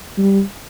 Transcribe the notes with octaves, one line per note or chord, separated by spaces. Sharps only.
G3